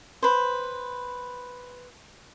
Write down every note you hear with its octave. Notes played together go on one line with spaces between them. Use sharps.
B4 C5